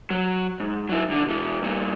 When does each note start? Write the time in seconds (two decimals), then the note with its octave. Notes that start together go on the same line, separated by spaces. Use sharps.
0.10 F#3
0.60 G#2
0.89 F#3 E4
1.09 C2 D3
1.25 B2 E3
1.62 G2 A#2